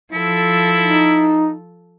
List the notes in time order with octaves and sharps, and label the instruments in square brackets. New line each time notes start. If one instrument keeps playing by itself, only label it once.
[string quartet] F3 A4 [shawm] E4
[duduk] D#4